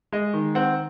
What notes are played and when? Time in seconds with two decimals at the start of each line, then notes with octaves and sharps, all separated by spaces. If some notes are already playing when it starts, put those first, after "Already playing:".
0.12 G#3 D#5
0.34 D#3
0.55 C4 F#5